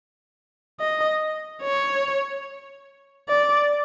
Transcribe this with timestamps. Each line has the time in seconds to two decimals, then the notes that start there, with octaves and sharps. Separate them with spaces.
0.80 D#5
1.63 C#5
3.29 D5